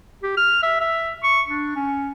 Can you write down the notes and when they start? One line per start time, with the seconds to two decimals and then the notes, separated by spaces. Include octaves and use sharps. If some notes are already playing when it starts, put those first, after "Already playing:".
0.23 G4
0.37 F6
0.63 E5
0.80 E5
1.23 C#6
1.48 D4
1.76 C#4